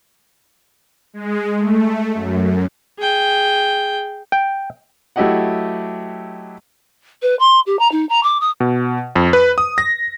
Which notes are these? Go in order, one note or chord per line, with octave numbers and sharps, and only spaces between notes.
G#3
A3
F#2
G#4 G5
G5
F#3 A3 E4 G4 D#5 F#5
B4
C6
G4
A#5
D#4
A#5
D6
D#6
B2
F2
B4
D#6
A#6